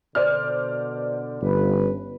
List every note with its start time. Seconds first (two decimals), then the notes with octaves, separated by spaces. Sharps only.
0.15 B2 D3 C5 D5 F6
1.42 G1 C#4 B4